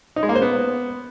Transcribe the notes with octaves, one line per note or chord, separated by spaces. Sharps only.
D#4
G#3
A#3
C5
B3